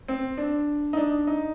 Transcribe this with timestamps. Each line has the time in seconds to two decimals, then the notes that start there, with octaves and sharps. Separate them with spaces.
0.08 C4
0.37 D4
0.93 D#4
0.97 D4
1.27 D#4